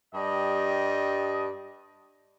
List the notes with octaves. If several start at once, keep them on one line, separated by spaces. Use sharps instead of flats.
G2 G3 D#5